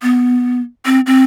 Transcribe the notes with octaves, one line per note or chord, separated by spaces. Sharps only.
B3
C4
C4